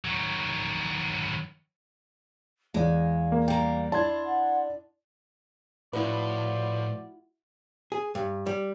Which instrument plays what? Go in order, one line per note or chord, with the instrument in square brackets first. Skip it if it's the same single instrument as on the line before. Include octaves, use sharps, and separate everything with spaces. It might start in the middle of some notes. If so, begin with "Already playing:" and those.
[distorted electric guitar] D#3 F#3
[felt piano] E2 D5 [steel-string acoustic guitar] G#3 [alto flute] F5
[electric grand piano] A#3
[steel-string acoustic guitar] G3 A#3 [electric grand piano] G5 A#5
[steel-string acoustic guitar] D4 [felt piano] E4 D5 [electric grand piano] A5 C6 G#6
[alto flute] F#5
[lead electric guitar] A2 [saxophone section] F3 D5 [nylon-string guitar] E4 F#4 [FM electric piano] B4
[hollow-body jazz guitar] G#4
G2
G3